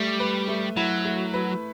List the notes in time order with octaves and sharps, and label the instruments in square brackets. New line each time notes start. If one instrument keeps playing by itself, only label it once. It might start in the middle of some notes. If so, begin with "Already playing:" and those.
Already playing: [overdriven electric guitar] G3 [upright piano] A3
[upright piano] B4
A3
[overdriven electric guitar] F#3 [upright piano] E4
[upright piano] A3
B4